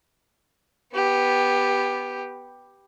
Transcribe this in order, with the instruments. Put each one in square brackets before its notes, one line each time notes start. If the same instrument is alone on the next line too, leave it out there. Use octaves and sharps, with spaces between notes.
[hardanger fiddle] B3 G4